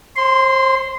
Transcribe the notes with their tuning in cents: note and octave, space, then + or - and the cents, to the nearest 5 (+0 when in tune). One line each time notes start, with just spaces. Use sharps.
C5 +35 C6 -15